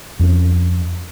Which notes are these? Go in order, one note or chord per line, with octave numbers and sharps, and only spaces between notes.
F2 C#4